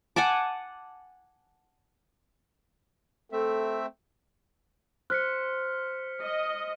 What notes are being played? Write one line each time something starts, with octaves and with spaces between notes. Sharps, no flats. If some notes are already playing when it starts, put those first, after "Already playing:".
F#5 G#5 A5 D6
A3 C4 A4 E5
C5 F6 F#6 B6 C#7
D#5